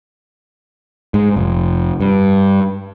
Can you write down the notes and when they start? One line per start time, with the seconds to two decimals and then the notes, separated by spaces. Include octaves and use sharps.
1.14 G#2
1.36 F1
2.01 G2